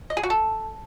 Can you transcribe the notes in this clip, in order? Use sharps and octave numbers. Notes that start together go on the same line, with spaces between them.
D#5
G#4
F#4
A4